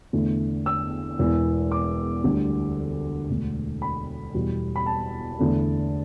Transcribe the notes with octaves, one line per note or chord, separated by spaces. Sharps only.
E2 D3 A3
E6
E1 E2 E3
D6
D2 D3 G3
E1 D2 D3
B5
E2 B2 G3
B5
A5
E2 D3 A3